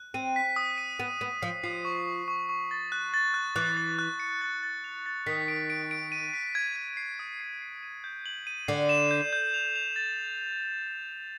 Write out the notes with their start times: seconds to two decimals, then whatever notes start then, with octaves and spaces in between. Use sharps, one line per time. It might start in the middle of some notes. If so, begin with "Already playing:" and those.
Already playing: F#6
0.14 C4 D#7
0.36 B6
0.56 D#6
0.78 D#7
0.99 B3 D#7
1.21 B3 D#7
1.42 F3 C7
1.64 F3 C7
1.85 C#6
2.06 C#6
2.28 C#6
2.49 C#6
2.71 A6
2.92 F#6
3.14 A6
3.34 F#6
3.56 E3 F#6
3.77 A6
3.99 F#6
4.20 C#7
4.41 A6
4.63 A6
4.84 F7
5.06 A6
5.26 D#3 B6
5.48 D7
5.70 D7
5.91 D7
6.12 D#7
6.33 B6
6.55 G#6
6.76 G#6
6.97 C7
7.19 D#6
7.40 C7
7.61 C7
7.83 D#7
8.04 G6
8.26 F#7
8.47 D#7
8.68 D3 C7
8.89 E7
9.11 G6
9.33 G6
9.54 F7
9.76 F7
9.96 A6